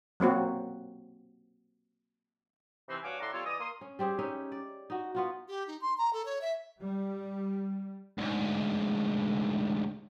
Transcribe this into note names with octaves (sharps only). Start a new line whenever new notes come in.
F#3 A#3 C4 F#4
C3 E3 C4 D#4 B5 C6
G2 F#4 C#5 F5 G#5 D6
A2 D5 E5 F#5 A#5 C6
G3 C4 F4 A4 C#5
E3 D5 D#5 D#6
A#3 C6 D#6
C#4
G3 C4 G4 G#4
C#4 D#4 E5
D5
D#4 F#4
B3 F4 F#4
G4
D#4
C6
A#5
A4
C#5
E5
G3
D2 G#2